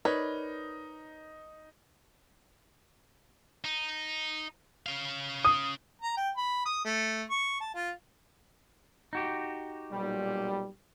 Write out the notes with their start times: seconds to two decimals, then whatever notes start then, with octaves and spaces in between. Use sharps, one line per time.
0.05 D#4 A#4 B4 C#5 D5
3.64 D#4
4.86 C#4 F5
5.45 D#6
6.02 A#5
6.17 G5
6.37 B5
6.66 D#6
6.85 A3
7.30 C#6
7.61 A5
7.75 F4
9.13 D#4 F#4 G4
9.92 B1 A#2 G3